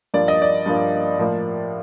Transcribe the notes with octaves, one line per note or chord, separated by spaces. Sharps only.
G2 F3 A#3 D5
D#5
D5
G2 F3 A#3
A2 F3 A#3